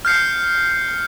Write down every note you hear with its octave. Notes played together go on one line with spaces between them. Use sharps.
F6 G6 C7 C#7